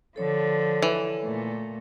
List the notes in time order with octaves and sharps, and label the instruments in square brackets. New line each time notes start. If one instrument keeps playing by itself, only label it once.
[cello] D3 F3 [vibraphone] A4 C#5
[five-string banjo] E3
[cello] A#2 A3